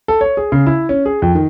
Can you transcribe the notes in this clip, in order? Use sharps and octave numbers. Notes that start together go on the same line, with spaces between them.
A4
C#5
G#4
C#3
E4
C#4
G#4
F2
D#3